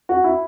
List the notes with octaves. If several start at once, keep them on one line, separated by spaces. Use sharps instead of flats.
F#4
E4